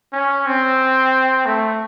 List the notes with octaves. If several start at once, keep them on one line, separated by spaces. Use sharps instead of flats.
C#4
C4
A3